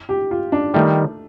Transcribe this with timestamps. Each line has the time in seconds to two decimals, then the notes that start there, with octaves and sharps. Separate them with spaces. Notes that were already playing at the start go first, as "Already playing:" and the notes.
0.09 G4
0.31 F4
0.52 D4
0.74 D#3 G3 A3